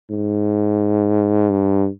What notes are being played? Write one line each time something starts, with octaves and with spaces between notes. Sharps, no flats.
G#2
G2